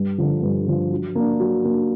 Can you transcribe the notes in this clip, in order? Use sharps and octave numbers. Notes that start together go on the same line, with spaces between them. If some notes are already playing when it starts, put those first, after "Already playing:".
Already playing: G2
D3 F3
G2
D3 F3
F#3
A#3 D4
F#3
A#3 D4